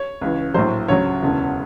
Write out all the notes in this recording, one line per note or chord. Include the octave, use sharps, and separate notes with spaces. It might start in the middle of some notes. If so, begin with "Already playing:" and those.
Already playing: C#5
C#2 C#3 E3
A#1 A2 F#3 C5
D2 C#3 F#3 C#5
E1 D2 C#3 E3